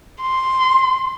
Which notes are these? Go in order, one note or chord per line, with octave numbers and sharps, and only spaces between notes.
C6